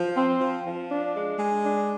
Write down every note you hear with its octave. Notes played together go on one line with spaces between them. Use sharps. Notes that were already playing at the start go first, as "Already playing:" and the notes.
Already playing: F3
C4
F3
F3
D4
G#3
G#3
D4